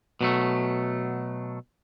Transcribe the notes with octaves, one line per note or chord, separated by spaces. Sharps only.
B2 F#3 A3